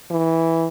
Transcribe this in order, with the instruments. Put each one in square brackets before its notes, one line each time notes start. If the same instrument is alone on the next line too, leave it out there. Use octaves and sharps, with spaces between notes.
[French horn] E3